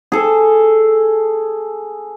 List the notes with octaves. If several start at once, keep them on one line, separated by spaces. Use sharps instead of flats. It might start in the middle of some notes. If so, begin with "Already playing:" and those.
G#4 A4